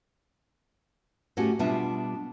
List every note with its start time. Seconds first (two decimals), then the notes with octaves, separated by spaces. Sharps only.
1.37 A2 B3 C#4 F#4 G4 G#5
1.59 B2 G3 B3 D4 F4 E5